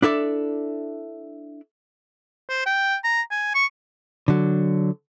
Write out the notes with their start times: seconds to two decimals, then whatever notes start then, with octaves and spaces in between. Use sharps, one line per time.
0.02 D4 E4 A4 D5
2.49 C5
2.66 G5
3.04 A#5
3.31 G#5
3.55 C#6
4.28 D3 F#3